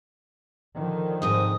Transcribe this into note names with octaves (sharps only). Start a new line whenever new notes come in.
D3 D#3 F3
G#2 C3 D#4 D#6